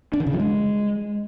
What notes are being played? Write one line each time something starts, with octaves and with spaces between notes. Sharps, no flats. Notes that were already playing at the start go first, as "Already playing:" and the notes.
D4
D#3
C#3
F3
G#3